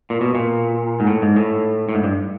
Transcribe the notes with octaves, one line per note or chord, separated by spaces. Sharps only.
A#2
B2
A#2
G#2
A2
G#2
A2
A2
G#2
G2